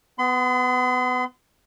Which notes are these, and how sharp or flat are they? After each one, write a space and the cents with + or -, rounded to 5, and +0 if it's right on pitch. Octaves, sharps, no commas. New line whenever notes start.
B3 +20 C6 -40